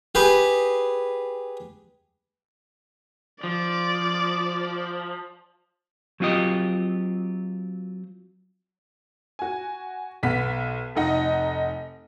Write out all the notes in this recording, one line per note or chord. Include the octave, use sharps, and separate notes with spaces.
G4 G#4 B4
F3 D5
F#3 C4 F4 G4 D#5
F#4 G#5
B1 B3 B6
F1 A3 D#4 D#5 F#5